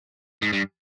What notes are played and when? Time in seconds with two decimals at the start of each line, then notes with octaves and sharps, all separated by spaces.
0.42 G#2
0.53 G2